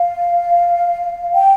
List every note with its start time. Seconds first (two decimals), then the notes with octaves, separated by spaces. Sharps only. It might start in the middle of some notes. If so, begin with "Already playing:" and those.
Already playing: F5
1.34 G5